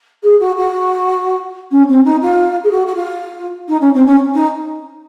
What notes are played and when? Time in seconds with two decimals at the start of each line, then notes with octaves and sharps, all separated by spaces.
0.23 G#4
0.40 F#4
0.56 F#4
1.71 C#4
1.88 C4
2.05 D#4
2.21 F4
2.64 G#4
2.71 F#4
2.86 F#4
2.95 F4
3.68 D#4
3.81 C#4
3.94 C4
4.06 C#4
4.34 D#4